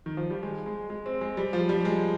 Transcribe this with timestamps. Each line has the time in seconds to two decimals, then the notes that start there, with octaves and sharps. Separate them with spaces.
0.06 D#3
0.17 F3
0.30 G3
0.43 G#3
0.66 G#3
0.90 G#3
1.06 C4
1.21 G#3
1.37 G3
1.53 F3
1.69 G3
1.85 G#3